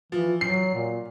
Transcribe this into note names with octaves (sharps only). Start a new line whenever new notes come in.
E3 F3
F#3 C7
A#2